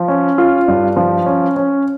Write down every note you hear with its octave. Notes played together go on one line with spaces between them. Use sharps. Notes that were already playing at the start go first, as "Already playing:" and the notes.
Already playing: F3
C#4
F4
G2
F3
C#4
C#4